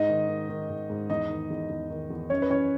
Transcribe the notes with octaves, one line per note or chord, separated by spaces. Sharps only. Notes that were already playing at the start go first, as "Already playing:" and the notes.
Already playing: G#2 D#4 D#5
D#3
D#3
D#3
G#2
G#2
E2 D#4 D#5
D#3
E2
E2
D#3
E2
F#2 C#4 C#5
B4
E3 C#4 C#5